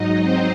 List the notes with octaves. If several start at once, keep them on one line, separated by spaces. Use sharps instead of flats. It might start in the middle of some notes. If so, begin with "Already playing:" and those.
Already playing: G#2 F#3 D#4 D#5
C4 C5